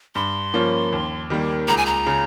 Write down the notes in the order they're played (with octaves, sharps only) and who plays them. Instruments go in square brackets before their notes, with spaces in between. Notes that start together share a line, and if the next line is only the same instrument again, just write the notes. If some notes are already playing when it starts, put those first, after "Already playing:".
[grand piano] G2 [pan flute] C6
[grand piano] F3 A#3 C#4
D#2
D#3 G3 A#3
[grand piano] C#2 [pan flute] A#5
[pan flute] G#5
A#5
[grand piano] C#3